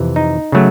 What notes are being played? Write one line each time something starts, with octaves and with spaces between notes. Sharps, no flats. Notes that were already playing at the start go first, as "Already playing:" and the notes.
Already playing: F2 C3 E3
D#4
C#3 F#3 A3